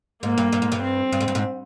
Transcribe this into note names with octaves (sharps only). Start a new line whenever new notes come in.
G#2 A#3
G2
G2
G#2
G2
C4
G2
G#2
G2
G#2